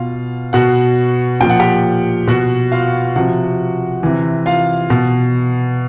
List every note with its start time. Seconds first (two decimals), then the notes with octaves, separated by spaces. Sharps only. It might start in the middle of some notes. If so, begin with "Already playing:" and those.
Already playing: B2 F4 F5
0.53 B2 F#4 F#5
1.41 A#2 F3 G5
1.50 F#5
1.60 G4 G5
2.27 B2 F#4 F#5
2.72 F4 F5
3.16 C3 F3 F#4 F#5
4.03 C3 E3
4.46 F4 F5
4.90 B2